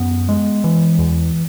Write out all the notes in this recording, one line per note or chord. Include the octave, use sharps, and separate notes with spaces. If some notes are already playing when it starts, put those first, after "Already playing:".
Already playing: F#2 B3
G#3
E3
E2